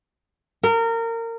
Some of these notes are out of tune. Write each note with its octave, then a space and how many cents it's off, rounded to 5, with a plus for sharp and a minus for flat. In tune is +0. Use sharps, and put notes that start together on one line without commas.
A#4 -25